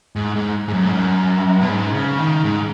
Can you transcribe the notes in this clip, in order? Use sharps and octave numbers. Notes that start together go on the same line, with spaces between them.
G#2
G#2
G#2
F#2
G#2
F#2
B2
G#2
C#3
D#3
G#2